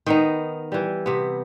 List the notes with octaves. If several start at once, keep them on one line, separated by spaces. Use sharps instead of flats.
D#3 B3 D#4
E3 G3
C3 B3